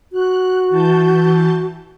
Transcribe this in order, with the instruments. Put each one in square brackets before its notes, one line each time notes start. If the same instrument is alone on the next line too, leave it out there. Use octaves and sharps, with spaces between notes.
[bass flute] F#4 [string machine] F#6
[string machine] E3 A5 G6